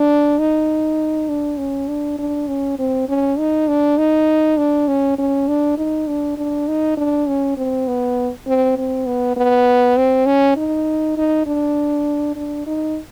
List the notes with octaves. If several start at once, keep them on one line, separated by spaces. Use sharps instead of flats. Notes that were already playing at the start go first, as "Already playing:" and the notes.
Already playing: D4
D#4
D4
C#4
D4
D4
C#4
C4
C#4
D#4
D4
D#4
D4
C#4
C#4
D4
D#4
D4
D4
D#4
D4
C#4
C4
B3
C4
C4
B3
B3
C4
C#4
D#4
D#4
D4
D4
D#4